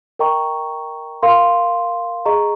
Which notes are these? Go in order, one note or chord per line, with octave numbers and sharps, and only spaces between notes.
A#4 D#5 G5 A#5 C#6
A#4 F5 C6
G#4 D#5 A#5 C#6